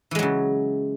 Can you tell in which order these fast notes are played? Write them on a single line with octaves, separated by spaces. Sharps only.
E3 G#3 F#3 C#3